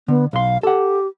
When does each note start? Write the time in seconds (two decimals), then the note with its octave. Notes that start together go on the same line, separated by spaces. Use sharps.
0.08 D3 B3
0.33 B1 F5 C6
0.63 G4 A4 F#5